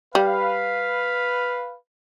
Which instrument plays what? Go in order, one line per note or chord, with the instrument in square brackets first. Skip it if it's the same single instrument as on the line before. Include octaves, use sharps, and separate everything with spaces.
[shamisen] G3 [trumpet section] B4 F5